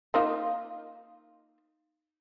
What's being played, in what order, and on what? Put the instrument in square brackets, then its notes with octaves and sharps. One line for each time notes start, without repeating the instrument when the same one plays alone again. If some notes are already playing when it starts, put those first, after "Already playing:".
[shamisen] A#3 D#4 F4